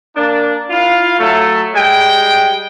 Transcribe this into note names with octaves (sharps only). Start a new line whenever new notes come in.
A#3 D4
E4 F4 F5
F#3 A3
G3 G#3 G5